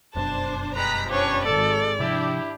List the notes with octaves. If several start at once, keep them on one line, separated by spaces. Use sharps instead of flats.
F1 F#2 B2 D4 C5 A5
G3 G#3 D4 B4 A#5 B6
F3 C#4 D4 G4 B4 C#5
G#1 G#3 A4 D5
C3 F3 D4 E4 G4